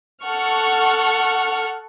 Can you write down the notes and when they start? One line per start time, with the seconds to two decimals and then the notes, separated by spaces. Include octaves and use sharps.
0.25 A4 F#5 C#6 F6